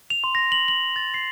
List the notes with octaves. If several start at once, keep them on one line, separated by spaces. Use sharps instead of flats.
F7
C6
A#6
F#7
F#7
A6
C7